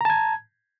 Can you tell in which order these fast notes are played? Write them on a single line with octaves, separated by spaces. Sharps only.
A#5 A5 G#6